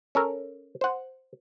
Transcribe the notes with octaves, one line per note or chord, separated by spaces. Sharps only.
C#4 A4 A#4
C5 F#5